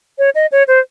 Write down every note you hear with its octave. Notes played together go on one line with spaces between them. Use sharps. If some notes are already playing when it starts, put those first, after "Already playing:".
C#5
D#5
C#5
C5